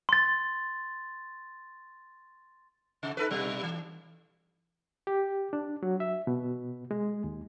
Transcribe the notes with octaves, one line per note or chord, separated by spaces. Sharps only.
C6 A6
C3
D#4 A4 B4
G2 B2 G3
E3
G4
D4
F#3
E5
B2
G#3
D#2